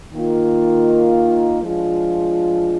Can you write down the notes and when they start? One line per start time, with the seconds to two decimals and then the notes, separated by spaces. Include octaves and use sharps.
0.13 D#3 A#3 F4
1.62 F3 G#3 D4 F4